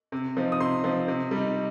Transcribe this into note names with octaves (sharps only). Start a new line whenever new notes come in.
C3
F3 C4 D#4
D#6
C3 C6
F3 C4 D#4
C3
G3 D#4